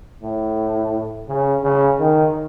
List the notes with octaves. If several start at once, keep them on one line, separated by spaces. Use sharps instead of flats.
A2
C#3
C#3
D#3